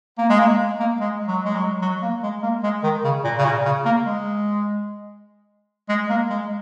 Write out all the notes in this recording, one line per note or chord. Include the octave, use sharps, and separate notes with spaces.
A#3
G#3
A#3
A#3
G#3
F#3
G#3
F#3
F#3
A#3
G#3
A#3
G#3
D#3
C#3
A#2
C#3
A#2
C#3
A#3
G#3
G#3
A#3
G#3